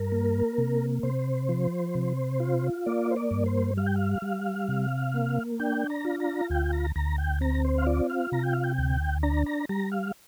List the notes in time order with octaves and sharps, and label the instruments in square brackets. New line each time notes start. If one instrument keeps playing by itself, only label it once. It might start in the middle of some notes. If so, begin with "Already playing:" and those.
Already playing: [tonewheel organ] G2 A#4
A#3
C3
C3 C5
F3
C3
F4
A#3 D5
C5
D5
G2
C5
G3 F5
G5
F5
G3
C3
A#3
D4 G5
A#5
F4
A#5
D2 G5
A#5
D2 A#5
G5
C4 A#5
C5
F5
F4 D5
F5
C3 A#5
G5
F5
G5
D2
D4 A#5
A#5
G3 A#5
F5